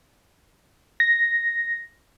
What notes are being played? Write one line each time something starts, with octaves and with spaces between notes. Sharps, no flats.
A#6